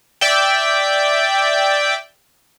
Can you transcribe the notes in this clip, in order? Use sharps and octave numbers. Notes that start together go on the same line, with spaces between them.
D5 E5 G5